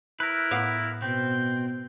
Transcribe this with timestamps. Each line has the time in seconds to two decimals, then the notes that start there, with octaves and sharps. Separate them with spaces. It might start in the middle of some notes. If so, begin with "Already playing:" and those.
0.20 E4 A#4 B4
0.51 A2 B3 F5
1.02 B2 C4 G5